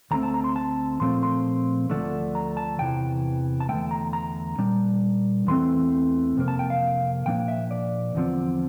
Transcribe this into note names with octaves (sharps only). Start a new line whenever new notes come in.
D2 D3 A3 C4 A#5
A5
A#5
C6
A5
A#2 F3 A3 C4 C6
C6
D2 D3 F3 A3 D4
A#5
A5
E2 C3 E3 G5
A5
E2 D3 A3 G5
A#5
A#5
A#2 G3 D4
E2 E3 A3 C4 C6
F2 C3 A#3
A5
G5
F5
A#2 F3 A#3 D4 G5
E5
D5
E2 D3 F3 C4